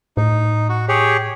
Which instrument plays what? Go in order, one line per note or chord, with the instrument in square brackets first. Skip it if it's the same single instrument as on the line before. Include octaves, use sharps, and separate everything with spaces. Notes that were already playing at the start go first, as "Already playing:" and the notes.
[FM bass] A2 [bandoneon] D#4
[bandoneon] F#4
G4 G#4 C#5